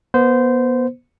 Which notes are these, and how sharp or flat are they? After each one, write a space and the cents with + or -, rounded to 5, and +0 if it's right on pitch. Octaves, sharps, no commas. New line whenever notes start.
B3 -30 C5 -20